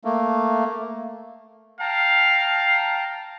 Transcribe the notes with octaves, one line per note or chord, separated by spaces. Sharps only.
A3 A#3
F5 G5 A5 A#5